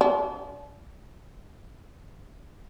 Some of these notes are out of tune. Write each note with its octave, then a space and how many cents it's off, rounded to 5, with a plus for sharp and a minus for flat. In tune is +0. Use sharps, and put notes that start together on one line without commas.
D4 -40